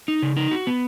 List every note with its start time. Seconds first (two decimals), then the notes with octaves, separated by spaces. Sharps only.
0.08 D#4
0.22 C#3
0.37 D#4
0.51 F#4
0.67 B3